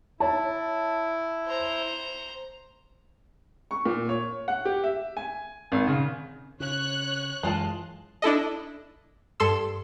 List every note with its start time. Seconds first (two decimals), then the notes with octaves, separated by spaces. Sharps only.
0.20 E4 C#5 A5
1.46 C5 A#5
3.71 C#6
3.86 A#2
4.09 C#5
4.48 F#5
4.65 G4
4.84 E5
5.17 G#5
5.72 G#1
5.87 C#3
6.60 C#3 C#5 F#6
7.43 F#2 E3 G#3 F4 A5
8.22 D4 E4 A4 D#5
9.40 G2 A4 C6 E6